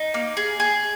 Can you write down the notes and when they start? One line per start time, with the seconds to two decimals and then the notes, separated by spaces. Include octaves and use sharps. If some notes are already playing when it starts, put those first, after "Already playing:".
Already playing: D#4
0.14 A#3
0.37 G#4
0.60 G#4